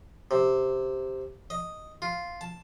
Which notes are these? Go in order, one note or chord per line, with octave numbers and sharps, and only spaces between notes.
C3
D#5
F4
A5